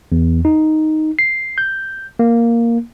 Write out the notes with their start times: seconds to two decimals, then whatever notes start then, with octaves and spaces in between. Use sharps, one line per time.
0.12 E2
0.45 D#4
1.19 C7
1.58 G6
2.19 A#3